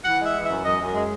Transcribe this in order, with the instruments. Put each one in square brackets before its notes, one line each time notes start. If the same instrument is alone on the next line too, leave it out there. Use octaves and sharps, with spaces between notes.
[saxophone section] E3 F#5
G#3 E5
E3
E5
F#2
F#2 D#5
F#2
G#3